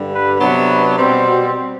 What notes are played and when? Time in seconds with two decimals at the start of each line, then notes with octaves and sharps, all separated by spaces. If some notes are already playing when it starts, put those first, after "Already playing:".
Already playing: G2 D3 G3
0.13 B4
0.40 C3 F#3 B3 D4
0.97 B2 G3 C4
1.26 F#4